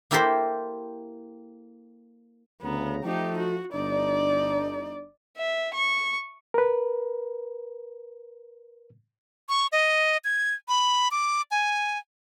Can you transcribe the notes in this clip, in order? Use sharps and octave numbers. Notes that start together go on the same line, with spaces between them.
A#3 E4 G4 A4 A#4 C5
D2 C#3 B3 A#5
F3 A3 D#4 G4
F#4
G1 D4 D#4 D5
E5
C#6
A#4 B4
C#6
D#5
G#6
B5
D6
G#5